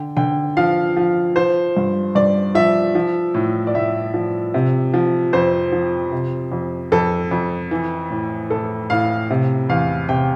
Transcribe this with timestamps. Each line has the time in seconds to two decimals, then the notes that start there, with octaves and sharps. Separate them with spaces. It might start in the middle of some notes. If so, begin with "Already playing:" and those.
Already playing: D3 G5
0.17 D3 G5
0.57 F3 F5
0.97 F3
1.36 F3 C5
1.77 G2
2.15 G2 D5
2.55 F3 E5
2.95 F3
3.34 A2
3.67 D5
3.75 A2 E5
4.14 F3
4.54 C3
4.94 F3
5.33 F2 C5
5.72 F3
6.12 C3
6.52 F2
6.92 F2 A4
7.31 F2
7.71 E3
8.10 A2
8.50 A2 A4
8.90 A2 F5
9.30 C3
9.69 E2 F5
10.09 C3 G5